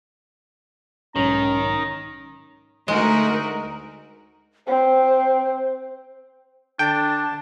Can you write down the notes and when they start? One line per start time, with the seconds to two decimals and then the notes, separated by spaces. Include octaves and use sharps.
1.16 B1 G#2 D#3 C#4 A#5
2.88 D2 G#3 D#4 F#4 A#4
4.67 C4 C5
6.79 D3 D4 G5 A5